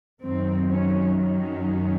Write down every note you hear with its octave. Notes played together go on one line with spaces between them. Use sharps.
F#2 D#3 F#3 C4
C#4
C#4